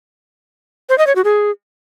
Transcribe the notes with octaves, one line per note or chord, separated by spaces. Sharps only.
C5
D#5
C#5
F#4
G#4